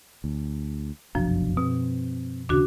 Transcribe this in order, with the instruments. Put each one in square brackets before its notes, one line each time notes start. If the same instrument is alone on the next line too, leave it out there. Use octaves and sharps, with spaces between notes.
[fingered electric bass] D2
[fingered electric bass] F1 B1 D4 [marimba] F#2 F3
[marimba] B2 [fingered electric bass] C4
[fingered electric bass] D#2 C#3 [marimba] D4 F#4